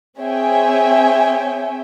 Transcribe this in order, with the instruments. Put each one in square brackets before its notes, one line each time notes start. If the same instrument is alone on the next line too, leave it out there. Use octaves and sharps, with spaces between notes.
[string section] C4 G#4 C#5 E5 G5 G#5